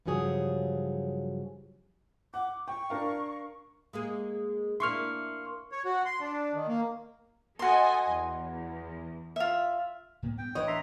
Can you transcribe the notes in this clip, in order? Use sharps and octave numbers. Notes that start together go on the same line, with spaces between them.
G2 C#3 F3 F#3 G#4 C#5
F#5 D6
G5 C#6
D4 A#4 F5
G#3 A#3 G#4
A#3 D4 E4 C6 C#6 F6
C#5
F#4
C6
D4
D#3
A#3
F#4 A4 D#5 G#5 C6
E2
F4 E5
A2 A#3 B3
G2 B3 G5
A1 E3 D4 B4 C#5 D#5
E5 A#5 C6